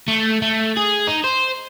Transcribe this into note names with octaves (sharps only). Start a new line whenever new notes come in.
A3
A3
G#4
D#4
C5